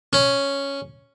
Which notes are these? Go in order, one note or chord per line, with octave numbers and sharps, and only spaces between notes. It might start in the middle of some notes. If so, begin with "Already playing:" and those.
C#4